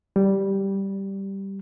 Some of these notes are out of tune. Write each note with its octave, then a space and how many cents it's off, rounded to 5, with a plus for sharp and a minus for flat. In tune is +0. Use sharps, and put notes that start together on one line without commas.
G3 -5